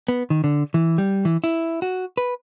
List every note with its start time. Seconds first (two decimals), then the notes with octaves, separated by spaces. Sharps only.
0.08 B3
0.30 D#3
0.44 D3
0.74 E3
0.98 G3
1.25 E3
1.44 E4
1.82 F#4
2.17 B4